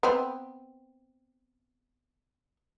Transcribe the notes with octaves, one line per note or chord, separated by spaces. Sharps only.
B3 C4